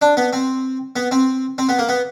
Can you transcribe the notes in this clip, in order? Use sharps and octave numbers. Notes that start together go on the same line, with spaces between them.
D4
B3
C4
B3
C4
C4
B3
A#3
B3